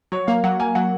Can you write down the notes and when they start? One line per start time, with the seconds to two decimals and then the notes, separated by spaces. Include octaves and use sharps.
0.12 F#3 C#5
0.27 A#3 F5
0.44 F#3 F#5
0.60 A#3 G#5
0.75 F#3 F#5